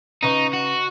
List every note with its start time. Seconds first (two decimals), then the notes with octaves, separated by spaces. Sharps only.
0.23 C#3 D#4 B4 C#6
0.53 F#4